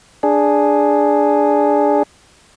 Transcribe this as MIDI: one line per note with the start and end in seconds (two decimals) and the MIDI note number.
0.23 2.03 62
0.23 2.03 68